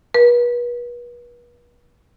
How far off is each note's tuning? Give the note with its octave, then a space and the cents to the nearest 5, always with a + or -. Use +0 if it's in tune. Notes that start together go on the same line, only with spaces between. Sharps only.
B4 -40